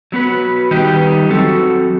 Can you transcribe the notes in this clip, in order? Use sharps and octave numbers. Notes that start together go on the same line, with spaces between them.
F#3 B3 F#4 B4
D#3 G3 D#4 G4 B4
F#3 C4 F#4 A4